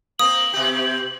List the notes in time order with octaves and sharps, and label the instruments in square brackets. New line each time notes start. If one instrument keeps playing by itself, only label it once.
[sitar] A#3 C4 [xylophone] D#6 [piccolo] F#7
[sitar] B2 G4